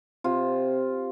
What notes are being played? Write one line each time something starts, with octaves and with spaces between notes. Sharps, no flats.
C3 F4